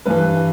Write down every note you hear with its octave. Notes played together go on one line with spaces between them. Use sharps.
G2 E3 B4